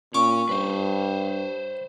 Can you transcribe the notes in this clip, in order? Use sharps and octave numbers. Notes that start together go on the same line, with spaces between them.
A#2 C#4 C#6 D6
G2 B4 C5